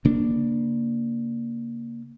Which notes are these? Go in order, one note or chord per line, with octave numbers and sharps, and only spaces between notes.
C#3 A#3 D4